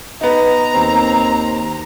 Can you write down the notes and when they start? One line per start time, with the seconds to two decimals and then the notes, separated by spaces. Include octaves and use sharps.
0.21 B3 D#4 A#5
0.74 D#2 C4